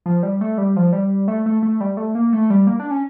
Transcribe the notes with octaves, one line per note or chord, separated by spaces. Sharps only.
F3
G3
A3
G3
F3
G3
A3
A3
A3
G3
A3
A#3
A3
G3
A#3
D4
C#4